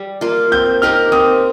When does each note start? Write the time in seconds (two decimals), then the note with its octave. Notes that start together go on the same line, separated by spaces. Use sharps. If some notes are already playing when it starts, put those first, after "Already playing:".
Already playing: G3
0.21 A#3 F4
0.52 C4 G6
0.82 D#4 G4 A#4 F6
1.12 C4 D#6